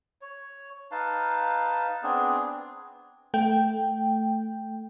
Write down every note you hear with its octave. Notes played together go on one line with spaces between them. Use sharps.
C#5
D#4 B4 F5 A5
B3 C4 D4 G#4
A3 G5